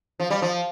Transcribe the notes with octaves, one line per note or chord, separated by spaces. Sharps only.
F3
G3
F3